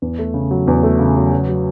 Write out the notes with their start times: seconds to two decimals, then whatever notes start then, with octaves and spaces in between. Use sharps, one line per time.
0.02 E2
0.19 A3
0.34 C#3
0.51 F#3
0.68 E2
0.83 A3
0.99 C#3
1.16 F#3
1.32 F#3
1.49 F#3